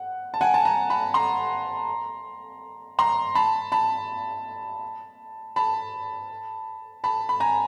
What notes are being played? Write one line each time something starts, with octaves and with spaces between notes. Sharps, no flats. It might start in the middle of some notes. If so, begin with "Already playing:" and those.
Already playing: F#5
A5
F#5 G#5
A5
G#5 A#5
A5 B5
A#5 C6
A#5 C6
A5 B5
A5 B5
A5 B5
A5 B5
B5
G#5 A#5